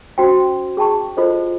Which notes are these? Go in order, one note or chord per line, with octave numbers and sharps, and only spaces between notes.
C#4 F#4 C5 G5
G#4 G5 A5 C#6
F4 A4 C5 D#5